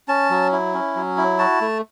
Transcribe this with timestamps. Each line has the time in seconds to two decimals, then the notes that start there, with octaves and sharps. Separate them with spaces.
0.08 C#4 A5
0.30 F#3
0.52 E4
0.74 C#4
0.96 F#3
1.17 E4
1.39 F#4 A5
1.61 A3